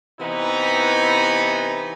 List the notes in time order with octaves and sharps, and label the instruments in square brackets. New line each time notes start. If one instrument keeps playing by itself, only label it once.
[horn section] C3 E3 B3 D#4 E4